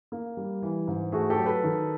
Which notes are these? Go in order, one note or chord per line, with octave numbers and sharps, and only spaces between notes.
A#3
G3
E3
G#2
A3 F#4 G#4
G4 A4
F#3
A4 B4
D#3